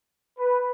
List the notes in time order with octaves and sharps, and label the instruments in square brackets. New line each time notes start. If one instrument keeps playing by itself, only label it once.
[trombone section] B4